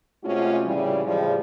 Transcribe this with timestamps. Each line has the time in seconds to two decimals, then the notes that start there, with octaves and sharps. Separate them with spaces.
0.24 C3 G#3 A3 C#4 F4 F#4
0.65 A2 C#3 E3 G3
1.05 A2 C#3 F3 G3 G#3